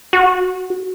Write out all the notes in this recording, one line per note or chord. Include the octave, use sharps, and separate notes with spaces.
F#4